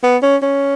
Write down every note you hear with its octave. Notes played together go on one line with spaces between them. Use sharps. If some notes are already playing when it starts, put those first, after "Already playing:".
B3
C#4
C#4